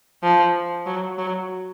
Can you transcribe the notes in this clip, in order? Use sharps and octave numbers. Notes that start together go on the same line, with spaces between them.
F3
F#3
F#3